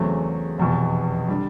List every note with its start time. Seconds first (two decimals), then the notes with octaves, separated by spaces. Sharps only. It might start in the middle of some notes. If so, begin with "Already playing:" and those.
Already playing: E2 C#3 F#3 A3 C4
0.59 F1 E2 B2
1.28 D3 G3